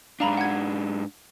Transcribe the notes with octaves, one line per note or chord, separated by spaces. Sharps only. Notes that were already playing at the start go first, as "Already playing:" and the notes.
G#2 D4 F5 A#5 B5
F#5 G#6